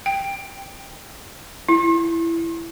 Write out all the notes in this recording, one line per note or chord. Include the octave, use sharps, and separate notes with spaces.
G5
E4